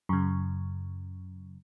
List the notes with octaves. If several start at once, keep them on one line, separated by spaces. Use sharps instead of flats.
F#2 C#3